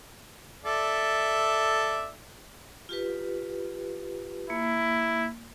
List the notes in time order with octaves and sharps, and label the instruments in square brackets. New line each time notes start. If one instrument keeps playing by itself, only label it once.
[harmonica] A4 D5 E5
[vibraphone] F4 G4 B4
[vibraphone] A#3 [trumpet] E4